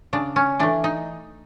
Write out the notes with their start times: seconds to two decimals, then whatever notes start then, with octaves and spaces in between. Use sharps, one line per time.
0.13 C#3 D4
0.36 C#4
0.59 E3 A3 D4
0.84 D#4